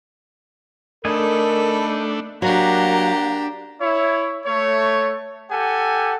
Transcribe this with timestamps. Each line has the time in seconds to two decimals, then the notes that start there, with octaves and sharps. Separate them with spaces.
1.05 A3 D4 D#4 A4 A#4 D#5 G#5 B5
2.42 F#3 A#3 D4 G4 F#5 A#5
3.80 E4 C#5
4.46 A3 C#5
5.50 G4 A4 F#5 G#5